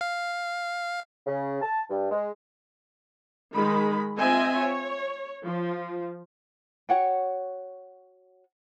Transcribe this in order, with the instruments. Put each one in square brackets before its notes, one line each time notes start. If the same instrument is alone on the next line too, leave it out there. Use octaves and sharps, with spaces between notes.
[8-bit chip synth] F5
[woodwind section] C#3
A5
G2
G#3
[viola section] D#3 G#3 B5
C4 F4 D#5 E5 G#5
C#5
F3
[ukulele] F#4 C#5 F#5 G5